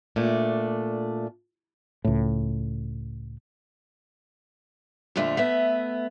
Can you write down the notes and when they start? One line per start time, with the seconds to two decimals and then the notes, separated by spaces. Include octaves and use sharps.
0.16 A#2 A3 D4
2.04 C#2 A2
5.16 F2 A#2 D3 A3 F4
5.37 A3 B3 E5